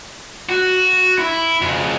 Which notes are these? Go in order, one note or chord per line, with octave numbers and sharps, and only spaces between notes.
F#4
E4
F2 C#3